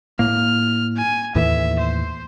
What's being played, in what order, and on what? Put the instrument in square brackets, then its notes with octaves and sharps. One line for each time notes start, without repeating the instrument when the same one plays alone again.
[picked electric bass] A2 A#3 [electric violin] F6
[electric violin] G#5
[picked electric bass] D#2 A2 E3 [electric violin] E5
[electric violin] C5